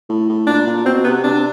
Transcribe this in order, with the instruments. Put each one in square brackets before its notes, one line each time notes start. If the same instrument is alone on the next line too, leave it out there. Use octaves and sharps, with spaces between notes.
[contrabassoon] A2
A2
[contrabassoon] A#2 [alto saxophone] D4
[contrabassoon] A#2
[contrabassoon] B2 [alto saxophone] C4
[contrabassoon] C3 [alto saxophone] B3
[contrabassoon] C3 [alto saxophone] D4